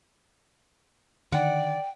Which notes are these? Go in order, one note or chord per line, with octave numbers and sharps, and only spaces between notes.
D3 D#3 D5 F#5 G5